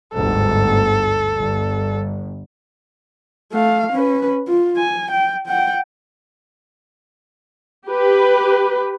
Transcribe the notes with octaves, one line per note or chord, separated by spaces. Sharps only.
G1 D2 G#2 A4
G1
A3 F5
C#4 B4
F4
G#5
G5
F#5 G5
G4 B4